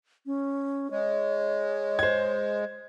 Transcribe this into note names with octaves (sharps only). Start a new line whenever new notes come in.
C#4
G#3 C#5
C5 G#6